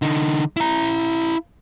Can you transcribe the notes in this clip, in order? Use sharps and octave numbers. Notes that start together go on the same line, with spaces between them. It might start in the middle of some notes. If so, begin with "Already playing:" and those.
D3 D#4
E4 A#5